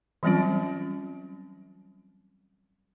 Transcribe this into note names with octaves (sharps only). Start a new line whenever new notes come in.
E3 F#3 G3 C4 C#4 F4